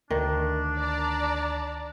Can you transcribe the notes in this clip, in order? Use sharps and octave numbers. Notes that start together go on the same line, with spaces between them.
D2 D#3 D4
D5 A5 A#5